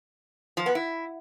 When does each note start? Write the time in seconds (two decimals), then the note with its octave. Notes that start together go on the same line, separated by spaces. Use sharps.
0.57 F3
0.66 B3
0.75 E4